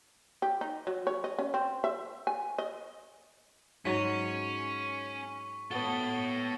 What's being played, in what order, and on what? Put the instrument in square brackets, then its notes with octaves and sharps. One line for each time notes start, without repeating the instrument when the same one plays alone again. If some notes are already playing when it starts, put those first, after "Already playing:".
[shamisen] G4
D#4
F#3
C#5
D#5
C#4
C4
E5
G#5
D#5
[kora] G#2 F#3 [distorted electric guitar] C#4 [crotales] C#6 B6
[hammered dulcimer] B3 F#4 [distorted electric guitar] A4 C#5 [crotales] G7